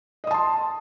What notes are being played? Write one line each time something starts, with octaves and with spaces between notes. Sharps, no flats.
D#5 A5 C6 D#6